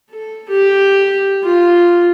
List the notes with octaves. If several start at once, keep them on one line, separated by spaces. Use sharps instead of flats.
A4
G4
F4